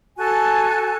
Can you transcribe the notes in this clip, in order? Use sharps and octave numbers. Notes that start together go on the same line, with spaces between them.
F#4 A4 G#5 A5